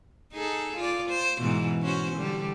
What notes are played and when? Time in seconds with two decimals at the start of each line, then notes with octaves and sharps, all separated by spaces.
0.33 D#4 G#4 A4
0.77 F4 D5
1.10 C5
1.41 G#2 B2 E3
1.83 C#4 F#4 C5
2.16 D3 G3